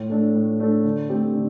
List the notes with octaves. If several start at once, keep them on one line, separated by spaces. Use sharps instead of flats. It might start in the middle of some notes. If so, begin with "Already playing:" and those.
Already playing: A2
A3 D4 A4
A2
A3 D4 A4
D3
A3 C4 G4
D3